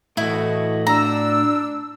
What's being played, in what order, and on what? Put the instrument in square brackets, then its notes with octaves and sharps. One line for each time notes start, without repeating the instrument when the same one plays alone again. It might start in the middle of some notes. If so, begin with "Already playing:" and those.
[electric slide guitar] A2 F#4 [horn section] E3 A3 D#5 [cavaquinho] E4
[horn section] D4 [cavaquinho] A#5 [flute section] E6